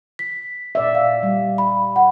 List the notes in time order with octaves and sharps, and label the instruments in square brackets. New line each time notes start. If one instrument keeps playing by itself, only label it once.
[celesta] B6
[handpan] A#2 D5 E5
[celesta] F5
[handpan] G3
[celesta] B5
F#5